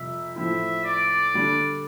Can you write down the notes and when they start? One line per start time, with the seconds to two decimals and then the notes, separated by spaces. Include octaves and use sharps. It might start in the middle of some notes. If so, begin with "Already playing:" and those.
Already playing: F2 C3 G3 E5
0.36 A2 F3 C4 E4 E5
0.85 D5
1.34 D3 G3 D4